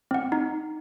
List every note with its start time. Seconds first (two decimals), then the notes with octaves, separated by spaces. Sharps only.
0.11 C4 F#5
0.32 D#4